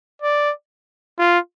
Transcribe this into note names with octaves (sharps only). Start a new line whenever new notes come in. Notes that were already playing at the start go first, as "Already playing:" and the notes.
D5
F4